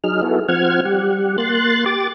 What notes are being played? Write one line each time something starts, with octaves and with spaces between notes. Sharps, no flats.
F#3 D#4 G#4 F6
B3 E4 F#4 G#4 A4
F3 C4 F#5 F6 G#6
G3 G4 F#5
A#3 C6 F#6 A6
G4 D6 A6